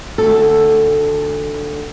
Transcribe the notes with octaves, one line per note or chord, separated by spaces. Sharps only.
D2 A4